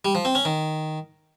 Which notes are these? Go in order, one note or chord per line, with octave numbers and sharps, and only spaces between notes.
G3
F3
C4
C#4
D#3